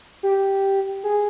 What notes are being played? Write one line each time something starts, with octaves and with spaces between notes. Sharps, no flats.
G4
G#4